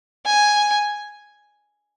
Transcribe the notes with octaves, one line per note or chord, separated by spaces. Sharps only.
G#5